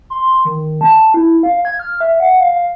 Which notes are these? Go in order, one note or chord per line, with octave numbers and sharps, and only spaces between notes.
C6
D#3
A5
E4
F5
G#6
F6
E5
F#5
F5